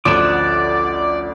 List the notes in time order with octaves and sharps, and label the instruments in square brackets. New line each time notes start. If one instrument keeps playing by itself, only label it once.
[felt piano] A1 D2 E7 [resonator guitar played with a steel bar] F3 [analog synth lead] D5 [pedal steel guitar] F#5 D6